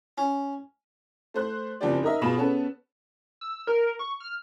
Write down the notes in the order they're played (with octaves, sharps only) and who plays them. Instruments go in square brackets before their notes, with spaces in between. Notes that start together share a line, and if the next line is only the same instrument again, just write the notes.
[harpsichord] C#4
[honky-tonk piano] A3 C5 F#6
F#1 F2 C4 D4 G4 D5
D#4 A#4 D#5 E5
B2 F4 G#4 B5 E7
B3 C#4 G#4 A4 B4
[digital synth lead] E6
A#4
C#6
F6